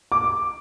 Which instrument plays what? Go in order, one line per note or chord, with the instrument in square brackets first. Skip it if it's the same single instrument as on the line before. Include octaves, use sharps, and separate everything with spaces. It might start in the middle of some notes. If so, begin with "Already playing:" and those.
[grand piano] D6